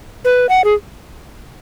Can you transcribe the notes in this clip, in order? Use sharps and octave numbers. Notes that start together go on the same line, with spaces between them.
B4
F#5
G#4